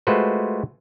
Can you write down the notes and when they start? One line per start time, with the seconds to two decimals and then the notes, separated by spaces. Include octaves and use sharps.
0.07 G#3 A3 F4 F#4 B4 C5